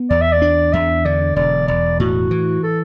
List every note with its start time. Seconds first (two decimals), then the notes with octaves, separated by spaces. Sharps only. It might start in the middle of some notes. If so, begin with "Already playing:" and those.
Already playing: B3
0.10 E2 D5
0.21 E5
0.33 D5
0.42 D4
0.73 E2 E5
1.05 D3 D5
1.36 E1 D5
1.68 E1 D5
2.00 A2 F#4
2.31 E3
2.63 A4